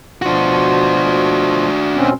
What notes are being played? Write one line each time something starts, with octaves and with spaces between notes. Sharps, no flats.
B2 F3 D4 F4 F#4
B2 C4 C#4